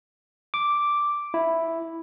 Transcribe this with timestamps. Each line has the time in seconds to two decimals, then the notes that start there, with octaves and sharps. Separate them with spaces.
0.54 D6
1.34 E4